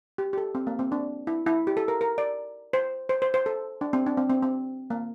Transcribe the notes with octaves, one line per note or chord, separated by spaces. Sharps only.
G4
G4
A4
C4
A#3
C4
D4
E4
E4
G4
A4
A#4
A#4
D5
C5
C5
C5
C5
A4
D4
C4
D4
C4
C4
C4
A#3